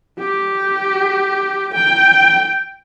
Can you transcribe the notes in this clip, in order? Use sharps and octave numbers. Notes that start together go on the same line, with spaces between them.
G4
G5